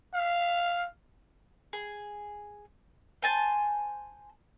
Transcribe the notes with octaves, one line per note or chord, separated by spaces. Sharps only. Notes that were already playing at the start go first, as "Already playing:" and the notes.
F5
G#4
C5 G#5 A5